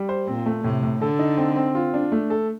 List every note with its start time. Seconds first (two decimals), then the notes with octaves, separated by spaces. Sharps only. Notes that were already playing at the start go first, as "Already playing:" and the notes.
Already playing: G3
0.09 C5
0.27 A#2 C4
0.46 A3
0.64 A2 C3
0.83 A2
1.01 D3 A4
1.19 D#4
1.37 C4
1.56 C4
1.75 F4
1.94 D4
2.12 A3
2.30 A4